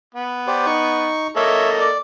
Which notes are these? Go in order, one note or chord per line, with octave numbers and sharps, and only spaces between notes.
B3
G4 C5 D5
D#4 C#6
A#3 A4 C#5 D#5 E5
D5